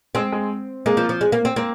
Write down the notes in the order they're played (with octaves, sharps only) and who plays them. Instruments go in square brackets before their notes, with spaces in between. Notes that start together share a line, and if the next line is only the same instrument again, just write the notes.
[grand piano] G#3 [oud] C4
[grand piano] G#3
[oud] G#3 [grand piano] A#3
[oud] F3
F3
G#3
A#3
C4
[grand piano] A#3 [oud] C4